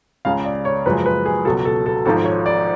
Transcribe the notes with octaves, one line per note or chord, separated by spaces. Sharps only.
C#2 C#3 G#3 F5
D5
C#5
F#1 F#2 F3 G#3 B4
B4
G#4
C#2 B2 F#3 A4
A4
A4
G#1 G#2 F3 A4
C#5
D5